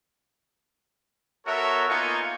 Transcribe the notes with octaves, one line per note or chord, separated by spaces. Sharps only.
B3 F#4 A4 A#4 C#5 E5
A#3 B3 D#4 F4 G#5 C#6